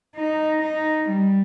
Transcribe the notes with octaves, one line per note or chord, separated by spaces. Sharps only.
D#4
D#4
G3